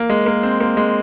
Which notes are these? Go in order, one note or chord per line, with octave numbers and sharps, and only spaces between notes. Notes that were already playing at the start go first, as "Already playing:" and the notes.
Already playing: A#3
G#3
A#3
C4
A#3
G#3